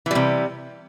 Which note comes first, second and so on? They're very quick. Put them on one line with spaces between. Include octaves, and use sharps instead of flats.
E3 G3 C3